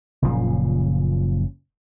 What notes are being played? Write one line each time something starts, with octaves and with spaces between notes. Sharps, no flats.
F#1 A#2 C#3 F3